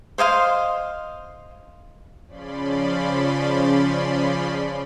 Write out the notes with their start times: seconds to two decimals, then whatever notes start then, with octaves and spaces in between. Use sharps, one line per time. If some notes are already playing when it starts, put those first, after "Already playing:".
0.18 C5 D#5 F5 C6
2.27 C#3 F3 C#4 D5 B5 C6